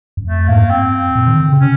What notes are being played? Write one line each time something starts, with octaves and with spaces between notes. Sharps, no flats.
F#2
F2 A3
A2 A#3
G#2
G2
F#2 C4
A#2
D#3
D3
C#3
C3 C#4